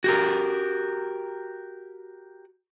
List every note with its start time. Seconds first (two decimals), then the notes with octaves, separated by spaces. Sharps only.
0.04 F#4 G4 A#4